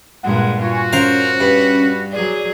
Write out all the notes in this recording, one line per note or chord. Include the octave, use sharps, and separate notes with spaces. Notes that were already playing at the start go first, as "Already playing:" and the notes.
G2 A#2 G#3 F#5
F4 F#4 G#5 C#6
C#4 A#4 C5 F5
G2 B4
F#3 G#4 D5